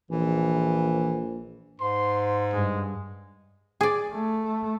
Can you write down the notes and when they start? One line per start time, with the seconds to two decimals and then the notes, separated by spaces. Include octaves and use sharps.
0.11 A#1 E3
1.80 G#2 C6
2.52 G2 G#3
3.81 G#4 D5
4.14 A3